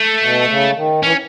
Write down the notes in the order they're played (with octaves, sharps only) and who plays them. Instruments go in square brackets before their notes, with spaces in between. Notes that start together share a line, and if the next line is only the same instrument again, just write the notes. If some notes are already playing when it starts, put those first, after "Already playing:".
Already playing: [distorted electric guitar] A3
[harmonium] B2
C#3
D#3
[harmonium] E3 [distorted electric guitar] C#4